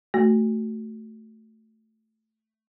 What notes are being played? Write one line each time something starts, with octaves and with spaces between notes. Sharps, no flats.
A3 F#4